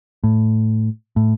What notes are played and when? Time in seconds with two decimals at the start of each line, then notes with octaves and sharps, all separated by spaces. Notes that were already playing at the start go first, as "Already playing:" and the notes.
0.24 A2
1.16 A2